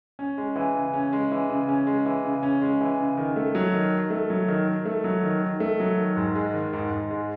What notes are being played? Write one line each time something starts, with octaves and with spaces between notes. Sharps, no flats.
C#4
G#3
E3
C#3
C#4
G#3
E3
C#3
C#4
G#3
E3
C#3
C#4
G#3
E3
C#3
D#3
A3
F#3
D#3
D#3
A3
F#3
D#3
D#3
A3
F#3
D#3
D#3
A3
F#3
D#3
G#2
G#3
D#3
G#2
G#2
G#3